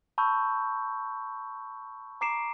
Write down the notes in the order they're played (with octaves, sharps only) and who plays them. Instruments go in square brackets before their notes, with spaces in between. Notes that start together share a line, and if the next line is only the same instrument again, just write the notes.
[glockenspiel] A5 B5 C#6 E6 G6
A#5 D6 C7 D7 E7